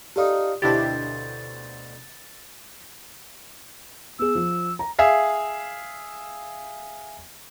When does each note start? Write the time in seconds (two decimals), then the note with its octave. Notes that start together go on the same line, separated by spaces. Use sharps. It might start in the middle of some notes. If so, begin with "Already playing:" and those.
0.16 D#4 F4 G4 A4 D5 D#6
0.62 D2 B2 D4 E4 G4 C5 A6
4.19 B3 G#4 E6
4.35 F3
4.79 A#5
4.99 G#4 E5 F5